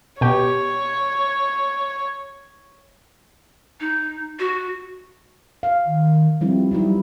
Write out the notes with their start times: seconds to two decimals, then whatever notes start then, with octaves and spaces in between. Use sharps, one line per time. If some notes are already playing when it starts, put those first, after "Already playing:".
0.21 B2 G4 C#5
3.81 D#4
4.39 F#4
5.63 F5
5.86 D#3
6.41 F3 G3 C4 E4
6.71 F#3 G3 D#4 E4